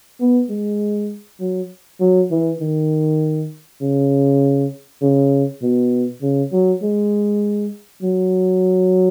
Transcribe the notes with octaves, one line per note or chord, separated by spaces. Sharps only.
B3
G#3
F#3
F#3
E3
D#3
C#3
C#3
B2
C#3
F#3
G#3
F#3